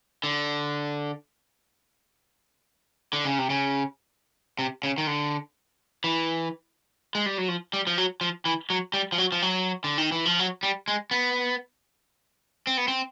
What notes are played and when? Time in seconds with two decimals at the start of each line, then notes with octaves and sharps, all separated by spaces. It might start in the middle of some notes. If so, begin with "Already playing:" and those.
0.24 D3
3.13 D3
3.25 C#3
3.38 C3
3.50 C#3
4.59 C3
4.83 C#3
4.98 D#3
5.07 D3
6.04 E3
7.15 G#3
7.26 G3
7.38 F#3
7.48 F3
7.73 G3
7.87 F3
7.98 F#3
8.21 F3
8.45 E3
8.70 F#3
8.94 G3
9.12 F3
9.18 F#3
9.32 F3
9.42 F#3
9.84 D3
9.98 D#3
10.12 E3
10.26 F3
10.39 F#3
10.63 G3
10.88 G#3
11.11 B3
12.67 C4
12.77 B3
12.88 C4